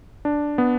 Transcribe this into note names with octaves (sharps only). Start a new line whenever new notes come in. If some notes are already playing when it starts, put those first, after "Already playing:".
D4
B3